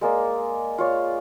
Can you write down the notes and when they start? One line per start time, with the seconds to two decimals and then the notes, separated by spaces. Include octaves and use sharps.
0.01 G#3 A#3 D5
0.78 F4 C#5 D5